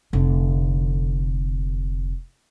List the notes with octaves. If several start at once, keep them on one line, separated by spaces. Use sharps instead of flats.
F1 D3